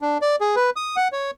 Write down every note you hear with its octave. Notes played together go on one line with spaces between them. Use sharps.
D4
D5
G#4
B4
D#6
F#5
C#5